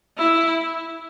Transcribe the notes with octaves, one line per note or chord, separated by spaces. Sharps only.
E4